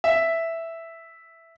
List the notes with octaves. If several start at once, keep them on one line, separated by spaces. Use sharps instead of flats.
E5